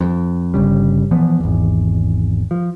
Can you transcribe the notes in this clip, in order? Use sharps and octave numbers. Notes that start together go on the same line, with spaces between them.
F2
G1 C#3 G3
A#2 E3 F3 B3
G#1 E2
F3